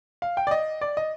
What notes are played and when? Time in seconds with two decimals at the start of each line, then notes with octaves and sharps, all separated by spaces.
0.22 F5
0.37 G5
0.47 D5
0.51 D#5
0.81 D5
0.97 D#5